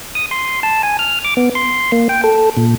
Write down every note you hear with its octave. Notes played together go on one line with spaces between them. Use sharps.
D#6
C6
A5
G#5
F6
D6
B3
C6
A#3
G5
A4
A#2